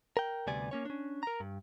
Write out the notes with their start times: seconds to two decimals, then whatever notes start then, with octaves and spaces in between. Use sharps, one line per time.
0.17 A#4 G5
0.47 D2 C3 G3 B3 D5 G#5
0.71 A#3 C#4 C#5
0.85 C#4 D4
1.23 A#4 A#5
1.40 G2